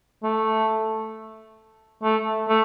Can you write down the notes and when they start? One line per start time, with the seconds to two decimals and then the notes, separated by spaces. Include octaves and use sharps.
0.24 A3
2.03 A3
2.49 A3